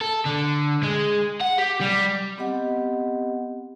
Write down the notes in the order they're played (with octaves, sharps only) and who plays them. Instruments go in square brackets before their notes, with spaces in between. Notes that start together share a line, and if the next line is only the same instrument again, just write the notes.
[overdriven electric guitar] A4
D3
G#3
F#5
G4
G3
[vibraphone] B3 C4 G4 D#5 F#5